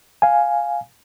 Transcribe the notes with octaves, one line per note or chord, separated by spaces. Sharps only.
F5 G#5